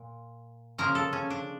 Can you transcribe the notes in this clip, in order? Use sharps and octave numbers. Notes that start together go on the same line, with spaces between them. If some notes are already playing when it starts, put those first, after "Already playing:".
Already playing: A#2
C#3 F3 A#3 A#4
A4
C#4
D4